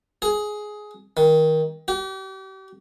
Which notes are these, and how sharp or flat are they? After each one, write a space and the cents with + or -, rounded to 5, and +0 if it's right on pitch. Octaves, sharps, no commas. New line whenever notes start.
G#4 +15
D#3 +20
G4 -40